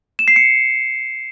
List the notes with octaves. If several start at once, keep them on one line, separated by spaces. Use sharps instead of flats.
E7
C7
C#7